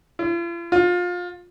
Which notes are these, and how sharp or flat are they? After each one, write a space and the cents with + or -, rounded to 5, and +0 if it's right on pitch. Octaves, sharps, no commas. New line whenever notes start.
F4 -45
F4 +25